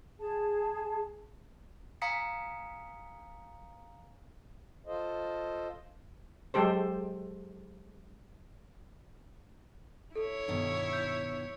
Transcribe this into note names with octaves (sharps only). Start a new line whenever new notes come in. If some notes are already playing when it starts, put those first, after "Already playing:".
G#4 A5
F5 G#5 A#5 D#6 B6 C#7
F4 A4 C5 D#5
F#3 G#3 G4 A4 C5
E4 A4 C#5
G2 B2 D#3
G6